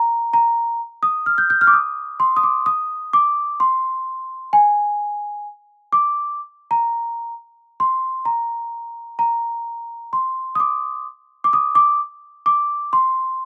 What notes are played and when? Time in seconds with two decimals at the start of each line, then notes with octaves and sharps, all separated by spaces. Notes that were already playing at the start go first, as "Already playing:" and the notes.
Already playing: A#5
0.33 A#5
1.03 D#6
1.26 F6
1.38 G6
1.50 G6
1.61 F6
1.67 D6
1.73 D#6
2.20 C6
2.36 D#6
2.43 D6
2.66 D#6
3.13 D6
3.60 C6
4.53 G#5
5.92 D6
6.71 A#5
7.80 C6
8.25 A#5
9.19 A#5
10.13 C6
10.55 D#6
10.60 D6
11.44 D6
11.53 D#6
11.75 D6
12.46 D6
12.93 C6